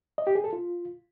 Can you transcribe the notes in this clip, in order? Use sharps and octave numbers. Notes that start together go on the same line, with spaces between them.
D#5
G4
G#4
A4
F4